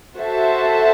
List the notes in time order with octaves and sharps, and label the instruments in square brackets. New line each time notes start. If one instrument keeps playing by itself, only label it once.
[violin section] F#4 A4 C5 E5 A5